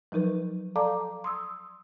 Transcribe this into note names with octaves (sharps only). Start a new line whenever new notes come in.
F3 F#3 D#4 A#4 B4
A4 D5 F5 A5 A#5 D6
C6 D#6 E6